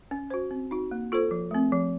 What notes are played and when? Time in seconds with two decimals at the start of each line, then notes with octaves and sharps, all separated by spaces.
0.11 C#4
0.30 F#4 C5
0.51 C4
0.71 D#4 F#4
0.91 A#3
1.12 F4 A4 C5
1.31 F3
1.51 A3 C4
1.72 F3